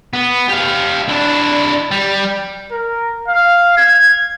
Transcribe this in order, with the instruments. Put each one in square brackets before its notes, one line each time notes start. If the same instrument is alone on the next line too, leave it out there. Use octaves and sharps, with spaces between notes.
[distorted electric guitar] B3
G4 F5
D4 E4
G3
[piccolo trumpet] A#4
F5
G#6